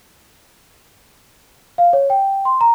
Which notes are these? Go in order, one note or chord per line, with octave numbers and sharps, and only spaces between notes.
F5
C#5
G5
C6
A#5